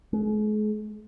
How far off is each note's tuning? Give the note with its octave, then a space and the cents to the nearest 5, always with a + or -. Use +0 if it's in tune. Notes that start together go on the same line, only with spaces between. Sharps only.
G#3 +40